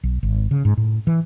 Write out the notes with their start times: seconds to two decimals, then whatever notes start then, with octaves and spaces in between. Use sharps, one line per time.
0.03 B1
0.23 G#1
0.51 C#3
0.65 G#2
0.77 A2
1.07 E3